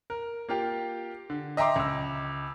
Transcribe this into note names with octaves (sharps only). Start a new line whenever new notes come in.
A#4
A#3 F4 G4
D3
D#5 E5 G5 A#5 C6 D6
C#2 E6